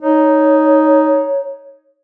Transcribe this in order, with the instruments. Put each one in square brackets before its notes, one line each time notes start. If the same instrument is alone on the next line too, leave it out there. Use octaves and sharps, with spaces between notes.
[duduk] D#4 [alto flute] C#5